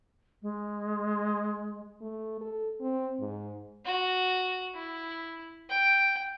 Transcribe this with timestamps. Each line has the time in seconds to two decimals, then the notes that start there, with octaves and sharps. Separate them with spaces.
0.42 G#3
2.01 A3
2.41 A4
2.81 C4
3.20 G#2
3.85 F#4
4.75 E4
5.70 G5